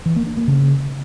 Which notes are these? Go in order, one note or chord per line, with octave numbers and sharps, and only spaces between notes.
E3
A#3
D4
A#3
C#3